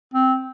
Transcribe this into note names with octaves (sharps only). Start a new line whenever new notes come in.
C4